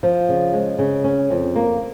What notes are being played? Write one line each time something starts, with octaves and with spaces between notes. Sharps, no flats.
F3
C#3
G#3
C#3
C#4
F2
A#3